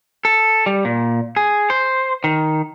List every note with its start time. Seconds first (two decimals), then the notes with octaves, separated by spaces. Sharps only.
0.25 A4
0.66 G3
0.85 A#2
1.36 G#4
1.70 C5
2.24 D#3